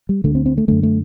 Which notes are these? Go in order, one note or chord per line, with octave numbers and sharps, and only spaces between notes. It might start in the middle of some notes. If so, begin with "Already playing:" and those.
G3
D2 D3 A3
C4
C4
A3
F#2 D3 A3
A3